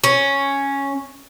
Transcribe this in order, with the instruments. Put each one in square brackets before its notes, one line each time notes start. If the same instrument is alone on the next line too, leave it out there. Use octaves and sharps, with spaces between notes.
[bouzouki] C#4